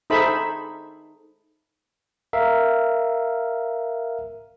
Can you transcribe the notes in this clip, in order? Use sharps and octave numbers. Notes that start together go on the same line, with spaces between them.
D#4 G#4 A4 C5 E5 B5
A#4 E5 F5